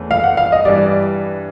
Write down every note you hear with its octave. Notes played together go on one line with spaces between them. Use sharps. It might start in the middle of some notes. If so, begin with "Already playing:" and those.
Already playing: E2 E3 A3 C#4
F5
F#5
F5
D#5
G2 E3 G3 D5